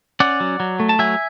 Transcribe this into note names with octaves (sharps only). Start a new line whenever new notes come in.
C#4 D5 F#5
F#3
F#3
A3
A5
F#3 E5 G#5